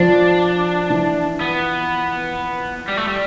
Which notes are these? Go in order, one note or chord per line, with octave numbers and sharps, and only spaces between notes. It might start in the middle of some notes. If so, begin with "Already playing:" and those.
Already playing: F3 D4
E3
B3
G3
A3
G3